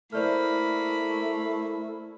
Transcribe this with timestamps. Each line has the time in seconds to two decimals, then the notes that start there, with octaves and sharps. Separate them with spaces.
0.13 A3 A#3 E4 C5 D5 B5 F6